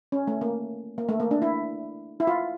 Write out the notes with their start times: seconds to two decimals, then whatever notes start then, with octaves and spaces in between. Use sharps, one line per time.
0.12 C#4
0.27 A3
0.41 A#3
0.98 A#3
1.09 A3
1.20 A#3
1.31 D4
1.42 E4
2.20 E4
2.27 F4